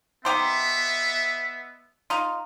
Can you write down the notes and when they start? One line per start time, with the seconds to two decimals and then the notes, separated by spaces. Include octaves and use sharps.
0.25 B3 D#4 G4 C5 E5
2.10 D#4 F4